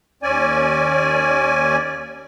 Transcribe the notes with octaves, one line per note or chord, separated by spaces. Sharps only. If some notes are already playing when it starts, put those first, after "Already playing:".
D#2 C#4 D5 G#5